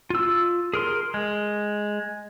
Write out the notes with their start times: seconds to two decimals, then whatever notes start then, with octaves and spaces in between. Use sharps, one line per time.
0.10 F4 E6
0.74 G#4 A#4 C6
1.14 G#3